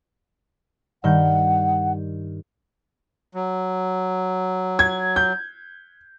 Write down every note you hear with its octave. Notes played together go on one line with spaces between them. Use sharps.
G2 D#3 F#5 G6
F#3
G#6
G6